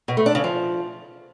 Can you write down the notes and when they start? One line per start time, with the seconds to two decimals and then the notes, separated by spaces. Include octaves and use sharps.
0.08 B2
0.17 A3
0.26 D4
0.35 C#3
0.44 F3